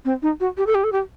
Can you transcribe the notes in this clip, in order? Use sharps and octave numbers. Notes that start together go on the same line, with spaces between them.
C4
D#4
F#4
G4
A4
G4
A4
G4